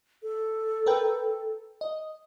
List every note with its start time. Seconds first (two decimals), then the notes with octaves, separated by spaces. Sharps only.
0.23 A4
0.86 A#4 B4 G5
1.81 D#5